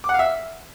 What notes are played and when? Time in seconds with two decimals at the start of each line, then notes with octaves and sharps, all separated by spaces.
0.04 D6
0.09 F#5
0.14 F5
0.19 E5